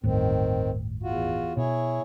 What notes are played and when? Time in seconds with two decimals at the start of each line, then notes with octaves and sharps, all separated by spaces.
0.04 G1 D#2 A2 D#3 C4
1.03 E2 F4 F#4
1.57 B2 E4 G#4 C#5